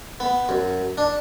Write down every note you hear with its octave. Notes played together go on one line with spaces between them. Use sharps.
B3
F#2
D4